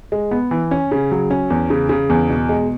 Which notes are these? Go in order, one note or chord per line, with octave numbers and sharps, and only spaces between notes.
G#3
B3
E3
C#4
C#3
F#3
C#4
E2
C#3
C#3
E2
B2
G#3